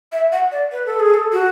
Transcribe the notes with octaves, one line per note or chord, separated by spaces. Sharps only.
E5
F#5
D5
B4
A4
G#4
A4
F#4